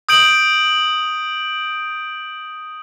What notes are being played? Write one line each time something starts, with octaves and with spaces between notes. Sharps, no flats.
D#6 G6 D7 F#7